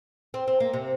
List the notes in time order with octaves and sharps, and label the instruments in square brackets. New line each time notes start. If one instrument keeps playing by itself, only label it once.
[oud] C4
C4
A#3
C3